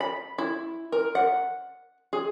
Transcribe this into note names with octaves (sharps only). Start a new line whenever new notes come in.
B5
E4
A#4
F#5
G#4